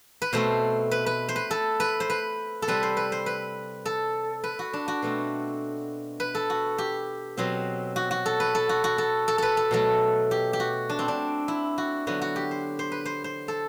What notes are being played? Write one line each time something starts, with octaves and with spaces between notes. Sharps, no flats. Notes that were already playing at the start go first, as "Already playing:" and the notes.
B4
B2 A3 C4 C5
B4
B4
C5
B4
A4
B4
C5
B4
A4
C3 G3 C4 B4
C5
B4
C5
B4
A4
B4
F#4
D4
F#4
B2 A3 C4
B4
A4
F#4
G4
B2 F#3 C4
F#4
F#4
A4
B4
A4
F#4
F#4
A4
A4
A4 B4
A4
B2 F#3 A3 A4
G4
G4
F#4
D4
C4
D4
E4
F#4
D3 F#3 B3 F#4
F#4
G4
C5
C5
B4
C5
C5
A4